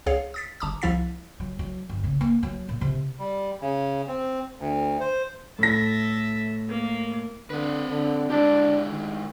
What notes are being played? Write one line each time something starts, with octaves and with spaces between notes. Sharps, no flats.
C#2 G#4 C#5 F5
D#6 A6 B6
G1 A5 A#5 D6 D#6
C2 F3 E4 F5 A6 B6
F#3
F#3
G1
C#3
A#3
F#3
A#2
C3
G3
C#3
C4
D2
C5
A2 A4 E5 A#6
A#3
D3 C4 B4
D3
G#3 D4 E4 G4
D#3